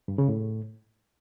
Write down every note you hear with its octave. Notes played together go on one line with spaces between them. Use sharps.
G2
C#3
A2